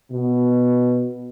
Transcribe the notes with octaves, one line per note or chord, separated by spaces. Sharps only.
B2